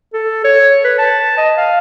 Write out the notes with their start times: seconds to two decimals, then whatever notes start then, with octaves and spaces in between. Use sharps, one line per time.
0.14 A4
0.45 C#5
0.84 B4
0.99 A5
1.38 D#5
1.57 F5